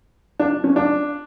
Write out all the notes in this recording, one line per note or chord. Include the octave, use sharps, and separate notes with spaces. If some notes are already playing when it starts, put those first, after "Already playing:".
D4
C#4
D4